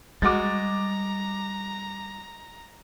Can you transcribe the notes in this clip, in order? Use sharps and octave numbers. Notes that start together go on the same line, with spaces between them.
G3 G#3 F#4 A#5 D6 A6